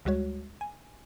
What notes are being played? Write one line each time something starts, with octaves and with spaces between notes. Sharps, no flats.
D2 G3 G#3 F#4 C#5
G#5